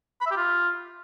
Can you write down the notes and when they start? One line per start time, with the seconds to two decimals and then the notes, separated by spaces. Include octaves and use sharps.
0.21 B5
0.26 E5
0.32 G4
0.37 F4